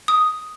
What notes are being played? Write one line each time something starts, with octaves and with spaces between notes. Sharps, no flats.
D#6